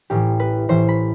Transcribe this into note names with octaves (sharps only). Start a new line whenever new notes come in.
A1 A2 E3 G4
B4
A1 A2 E3 C5
B5